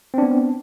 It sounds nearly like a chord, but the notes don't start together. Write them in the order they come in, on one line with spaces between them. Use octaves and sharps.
C4 D4 B3